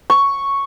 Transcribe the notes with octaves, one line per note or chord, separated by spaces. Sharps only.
C#6